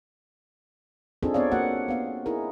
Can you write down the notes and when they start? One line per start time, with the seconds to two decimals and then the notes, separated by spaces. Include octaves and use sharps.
1.23 C4 D4 D#4 F4 G#4 A4
1.34 B3 C4 C#5 D5 F5
1.52 A#3 F#4 F#5
1.88 B3 F5
2.26 D#4 E4 G#4 A#4